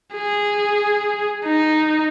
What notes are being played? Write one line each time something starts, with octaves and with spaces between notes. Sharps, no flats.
G#4
D#4